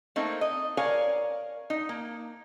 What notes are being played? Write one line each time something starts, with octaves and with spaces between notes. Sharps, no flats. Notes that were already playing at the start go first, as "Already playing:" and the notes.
A3 A#3 C4 D#4
D#5
A#4 C#5 D5 F5 G#5
D#4
A#3